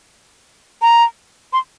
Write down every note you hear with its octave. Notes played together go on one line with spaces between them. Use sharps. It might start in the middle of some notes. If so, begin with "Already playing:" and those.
A#5
C6